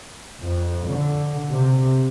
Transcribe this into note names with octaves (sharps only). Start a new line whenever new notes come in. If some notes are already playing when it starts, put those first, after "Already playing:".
F2
D3
C3